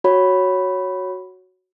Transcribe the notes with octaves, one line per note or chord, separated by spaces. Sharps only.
F#4 C#5 B5